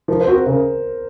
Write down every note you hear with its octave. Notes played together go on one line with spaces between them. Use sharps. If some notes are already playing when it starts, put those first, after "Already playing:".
F3 A#4
C5
C4 F#4
A#4
C#3 A#4